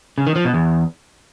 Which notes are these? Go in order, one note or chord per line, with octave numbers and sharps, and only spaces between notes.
C#3
D#3
F3
B2
E2